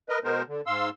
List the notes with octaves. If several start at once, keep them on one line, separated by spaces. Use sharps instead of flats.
A#4 B4 D#5
B2 G#3 B3 A#4 C5
D3
G#2 F5 C6 E6